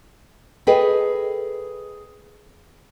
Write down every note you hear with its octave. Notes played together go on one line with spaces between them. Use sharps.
G#4 A4 B4 D#5 G5